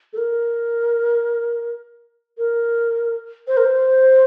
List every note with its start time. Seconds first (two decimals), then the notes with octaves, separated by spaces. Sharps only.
0.13 A4
0.18 A#4
2.38 A#4
3.48 C5
3.57 A#4
3.65 C5